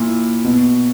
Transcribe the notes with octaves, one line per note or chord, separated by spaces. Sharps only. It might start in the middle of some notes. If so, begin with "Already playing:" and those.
Already playing: A#2 E4
B2